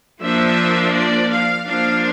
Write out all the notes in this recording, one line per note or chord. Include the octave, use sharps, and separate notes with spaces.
F3 A#3 D4 E5
D5
F5
F3 A#3 D4 F5